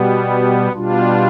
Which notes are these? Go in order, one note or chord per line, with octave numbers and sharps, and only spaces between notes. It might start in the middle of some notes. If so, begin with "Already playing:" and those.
Already playing: B2 G3 B3
B2 G3 D4 F4